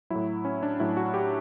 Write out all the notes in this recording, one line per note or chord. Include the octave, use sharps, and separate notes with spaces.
A2 F#3 E4
C#4
D4
A2 F#3 E4
F#4
G4